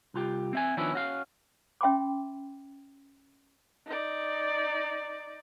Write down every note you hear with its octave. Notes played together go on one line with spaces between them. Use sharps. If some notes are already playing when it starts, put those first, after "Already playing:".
C2 F4 G4
C4 E5 G#5
D#3 F3 B3 C#4 D4 E4
C#4 F#4 F5
C#4 E5 G5 B5 C6 D6
D#4 D5